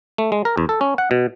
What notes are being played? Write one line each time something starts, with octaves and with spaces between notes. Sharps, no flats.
A3
G#3
A#4
E2
A4
C#4
F#5
B2